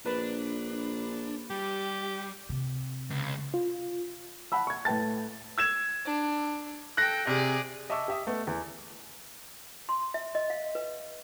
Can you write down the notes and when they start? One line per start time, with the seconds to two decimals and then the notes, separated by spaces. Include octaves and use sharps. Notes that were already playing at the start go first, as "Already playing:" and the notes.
0.06 A#1 D4 B4
1.50 G3 G4
2.49 C3
3.10 C#2
3.54 F4
4.52 F#5 A5 B5 E6
4.67 C#6 G#6
4.85 A2 B4 G5 A5 A6
5.58 E6 G#6 E7
6.05 D4
6.97 A4 G5 F#6 A#6
7.27 C3 G#4 D5
7.90 D#5 E5 A5 C#6 D6 E6
8.08 G4 E5 D#6
8.27 A3 B3
8.47 E2
9.89 C6
10.14 E5
10.35 D#5
10.50 F5
10.75 B4